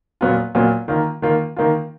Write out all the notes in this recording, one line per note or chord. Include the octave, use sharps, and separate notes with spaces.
A#2 F#3 B3 F4
A#2 F#3 B3 F4
D#3 A#3 F4
D#3 A#3 F4
D#3 A#3 F4